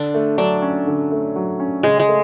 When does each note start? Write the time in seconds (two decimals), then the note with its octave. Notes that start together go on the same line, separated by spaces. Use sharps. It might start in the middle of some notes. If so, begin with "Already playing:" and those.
Already playing: D3 D4
0.14 A3
0.38 F#3 D4
0.62 C#4
0.87 D3
1.12 A3
1.36 F#3
1.60 C#4
1.83 C#3 G#3
1.99 G#3
2.08 A3